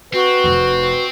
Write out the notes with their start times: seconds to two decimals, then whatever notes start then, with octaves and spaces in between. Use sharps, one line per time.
0.14 C4 F#4 B4
0.44 F1 F2